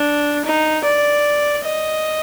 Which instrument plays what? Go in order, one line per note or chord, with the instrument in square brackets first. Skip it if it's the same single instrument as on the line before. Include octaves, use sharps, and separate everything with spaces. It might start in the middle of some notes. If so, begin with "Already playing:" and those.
Already playing: [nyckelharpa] D4
D#4
D5
D#5